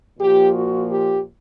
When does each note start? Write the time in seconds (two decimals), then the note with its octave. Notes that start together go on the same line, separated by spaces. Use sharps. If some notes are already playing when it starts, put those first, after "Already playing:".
0.18 A#2 F3 A#3 G4
0.53 F#4
0.88 G4